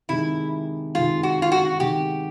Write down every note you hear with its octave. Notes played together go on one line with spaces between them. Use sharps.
C3 D#3 G#3 E4
C3 D#3 G#3 F4
F#4
F4
F#4
C3 D#3 G#3 G4